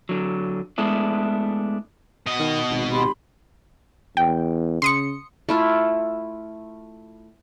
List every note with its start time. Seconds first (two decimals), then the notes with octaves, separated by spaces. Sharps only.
0.09 D3 F#3
0.78 G#3 A3 B3 D4 E4
2.26 B2 D#5
2.39 D#3
2.70 G#1
2.91 G4 B5 C6
4.17 E2 G5
4.82 C#3 C6 D#6 C#7
5.49 A3 E4 F4